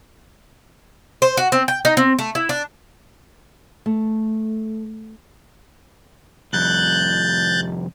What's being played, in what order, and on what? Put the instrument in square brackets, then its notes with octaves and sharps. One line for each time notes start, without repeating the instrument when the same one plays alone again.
[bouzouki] C5
F#4
C4
G5
D#4
C4
A3
E4
D4
[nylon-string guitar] A3
[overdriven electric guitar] C2 F2 [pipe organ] F#6 G6 A6